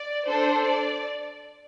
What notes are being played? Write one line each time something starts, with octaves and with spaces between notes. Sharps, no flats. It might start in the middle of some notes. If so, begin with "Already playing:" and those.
Already playing: D5
D4 A4 C5
D5